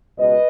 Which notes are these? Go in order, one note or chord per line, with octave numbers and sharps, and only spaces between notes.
C#2 B2 B4 D#5